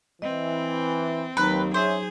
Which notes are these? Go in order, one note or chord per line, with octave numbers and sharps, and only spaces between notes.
E3 C4 D#5
D#2 F#3 D#4 B4 A#5
C#4 G#4 C5 E5